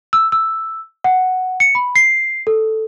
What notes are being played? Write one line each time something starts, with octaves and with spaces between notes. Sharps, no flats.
E6
E6
F#5
C#7
B5
C7
A4